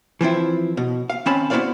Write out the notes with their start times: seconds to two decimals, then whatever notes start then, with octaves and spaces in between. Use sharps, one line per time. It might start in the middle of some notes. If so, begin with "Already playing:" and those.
0.21 E3 F3 C4 E4
0.77 B2
1.10 F5
1.26 D#3 C4 C#4 A5 B5
1.50 B3 E4 F#4 C5 D5 F5